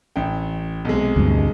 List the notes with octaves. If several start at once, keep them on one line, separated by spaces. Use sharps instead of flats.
A1 G5
B1 C3 G#3
D2 G2